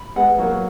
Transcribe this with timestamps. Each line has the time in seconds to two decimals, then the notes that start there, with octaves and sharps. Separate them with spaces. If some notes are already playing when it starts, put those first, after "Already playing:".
Already playing: B5
0.16 G#3 B3 F#5
0.29 B3
0.38 F#3 A#3 F#4